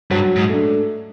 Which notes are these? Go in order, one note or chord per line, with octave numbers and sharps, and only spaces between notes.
G2 F#3
G#2
A3 D4